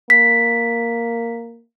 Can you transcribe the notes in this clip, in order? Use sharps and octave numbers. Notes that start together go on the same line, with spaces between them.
A#3 B6